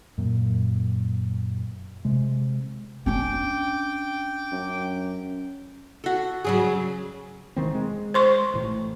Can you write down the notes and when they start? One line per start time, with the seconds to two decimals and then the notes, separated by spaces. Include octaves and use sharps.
0.18 F#2 A#2
2.05 C3 G#3
3.06 C#4 D4 G5 D6
4.52 F#2
6.04 F#4 A4
6.45 C#3 F#3 G#4
7.56 E1 D#3 C4
7.74 G#3
8.14 C5 C6 C#6
8.54 A1 A2